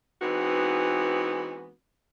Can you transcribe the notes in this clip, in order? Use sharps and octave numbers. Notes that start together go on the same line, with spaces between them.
E3 G#3 B3 C4 D#4 F#4